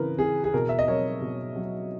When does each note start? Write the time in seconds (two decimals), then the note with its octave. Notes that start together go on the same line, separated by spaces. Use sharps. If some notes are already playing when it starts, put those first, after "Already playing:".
Already playing: C#3 E3 A#4 B4
0.18 E3 G#4
0.44 G#4
0.54 B2 A#4
0.69 E5
0.79 D#5
0.88 F#3 A#4 C#5
1.22 B2
1.56 F#3